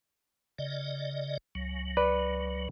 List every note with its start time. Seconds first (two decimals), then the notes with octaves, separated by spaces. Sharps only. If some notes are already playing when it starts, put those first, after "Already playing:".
0.58 C#3 D5 D#5
1.55 C#2 F#3
1.97 B4 D5